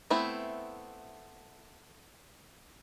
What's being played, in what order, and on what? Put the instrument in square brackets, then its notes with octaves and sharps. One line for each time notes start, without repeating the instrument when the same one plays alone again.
[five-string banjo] A3 B3 C4 E4